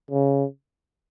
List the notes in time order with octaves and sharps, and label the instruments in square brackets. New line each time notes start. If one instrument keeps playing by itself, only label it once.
[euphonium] C#3